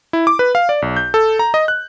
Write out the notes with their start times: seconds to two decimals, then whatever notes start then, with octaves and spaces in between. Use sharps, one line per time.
0.13 E4
0.27 D6
0.39 B4
0.55 F5
0.69 D5
0.82 B1
0.97 G6
1.14 A4
1.39 A#5
1.54 D#5
1.68 F#6